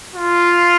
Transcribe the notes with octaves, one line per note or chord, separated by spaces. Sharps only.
F4